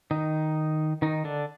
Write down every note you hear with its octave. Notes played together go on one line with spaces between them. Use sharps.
D#3 D#4
D#3 D#4
D3 D4